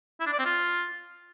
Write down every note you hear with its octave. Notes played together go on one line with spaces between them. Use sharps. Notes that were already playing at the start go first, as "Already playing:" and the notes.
E4
D4
D5
C4
F4